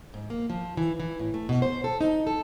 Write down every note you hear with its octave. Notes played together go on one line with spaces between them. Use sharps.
G#2
A#3
F3
E3
E3
A2
A3
B2
C5
A4
D#4
A4